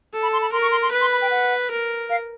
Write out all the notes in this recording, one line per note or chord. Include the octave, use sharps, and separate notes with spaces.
A4
B5
C6
B5
A#4 C6
C#6
C6
C6
B4
C6
B5
G5
F#5
A#4
F5